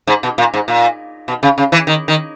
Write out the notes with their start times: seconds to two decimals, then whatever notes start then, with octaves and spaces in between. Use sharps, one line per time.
0.07 G#2
0.23 B2
0.38 A#2
0.54 G#2
0.68 A#2
1.28 B2
1.43 C#3
1.58 C#3
1.72 E3
1.87 D#3
2.08 D#3